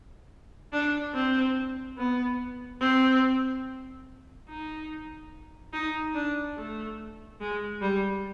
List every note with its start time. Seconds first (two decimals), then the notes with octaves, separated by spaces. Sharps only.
0.73 D4
1.15 C4
1.98 B3
2.81 C4
4.49 D#4
5.73 D#4
6.15 D4
6.57 A3
7.41 G#3
7.81 G3